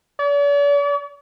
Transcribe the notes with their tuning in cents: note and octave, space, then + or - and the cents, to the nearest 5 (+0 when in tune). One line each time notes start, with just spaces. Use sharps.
D5 -45